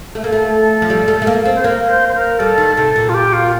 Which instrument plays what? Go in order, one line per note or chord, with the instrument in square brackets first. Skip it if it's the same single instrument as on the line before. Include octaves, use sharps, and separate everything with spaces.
[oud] A3 [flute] A4
[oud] A#3
A3
F3
G3
A3
A3
A#3
C4
[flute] C5
[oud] A#3 [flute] A#4
[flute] C5
C5
A#4
[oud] G3 [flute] A4
[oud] D#3
[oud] C3 [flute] A4
[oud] A#2
[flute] F4
G4
F4